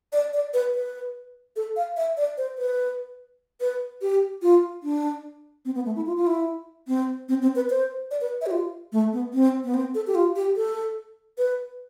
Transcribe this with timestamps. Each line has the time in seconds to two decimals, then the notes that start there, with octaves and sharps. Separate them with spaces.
0.13 D5
0.33 D5
0.54 B4
0.74 B4
1.56 A4
1.76 F5
1.97 E5
2.17 D5
2.38 C5
2.58 B4
3.61 B4
4.02 G4
4.42 F4
4.83 D4
5.65 C4
5.75 B3
5.86 A3
5.96 E4
6.06 F4
6.17 F4
6.27 E4
6.88 C4
7.29 C4
7.42 C4
7.55 B4
7.70 C5
8.11 D5
8.21 B4
8.41 E5
8.46 G4
8.51 F4
8.92 A3
9.13 B3
9.33 C4
9.64 B3
9.74 C4
9.95 A4
10.07 G4
10.15 F4
10.36 G4
10.56 A4
11.38 B4